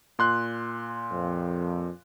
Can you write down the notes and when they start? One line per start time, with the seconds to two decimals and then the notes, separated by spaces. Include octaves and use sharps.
0.19 A#2 C6 F#6
1.11 F2